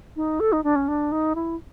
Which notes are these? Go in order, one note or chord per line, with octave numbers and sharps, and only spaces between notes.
D#4
A4
D#4
D4
C#4
D4
D#4
E4